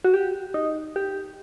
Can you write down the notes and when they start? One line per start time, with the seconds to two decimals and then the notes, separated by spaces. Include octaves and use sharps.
0.05 F#4
0.14 G4
0.54 D#4
0.96 G4